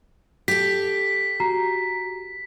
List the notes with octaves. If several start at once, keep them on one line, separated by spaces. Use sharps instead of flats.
G4 A4 B6
F#4 A#5 C7